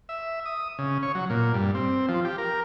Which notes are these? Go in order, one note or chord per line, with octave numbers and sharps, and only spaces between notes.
E5
D#6
C#3
C#5
F#3
A#2
G2
C4
F3
G4
A#4